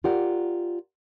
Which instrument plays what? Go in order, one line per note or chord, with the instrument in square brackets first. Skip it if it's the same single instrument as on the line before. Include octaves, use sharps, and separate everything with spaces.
[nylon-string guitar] F4 G4 A#4 D5 F#5